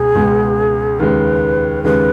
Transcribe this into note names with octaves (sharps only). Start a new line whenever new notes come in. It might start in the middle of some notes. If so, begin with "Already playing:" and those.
Already playing: C#2 B2 G#3 G#4
C#2 B2 G#3
D#2 C#3 G#3 B4
D#2 C#3 G#3 B4